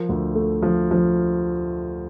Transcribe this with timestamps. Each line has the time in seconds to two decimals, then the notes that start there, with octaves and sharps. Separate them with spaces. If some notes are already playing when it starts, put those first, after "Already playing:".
Already playing: F3 A#4
0.09 D2
0.35 A3
0.62 F3
0.91 F3